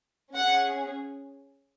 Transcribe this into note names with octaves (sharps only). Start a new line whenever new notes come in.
C#4 G#4 F#5